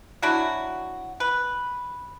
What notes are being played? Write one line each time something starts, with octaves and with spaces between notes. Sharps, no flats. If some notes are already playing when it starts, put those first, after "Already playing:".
F#3 D4 E4 F#4
B4